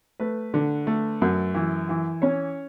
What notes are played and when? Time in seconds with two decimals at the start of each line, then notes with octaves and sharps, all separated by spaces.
0.20 A3 B4
0.54 D3
0.87 A3
1.22 F#2
1.55 E3
1.89 E3
2.22 C#4 C#5